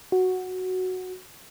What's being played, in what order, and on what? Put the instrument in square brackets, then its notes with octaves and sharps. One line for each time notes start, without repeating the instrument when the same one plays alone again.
[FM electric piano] F#4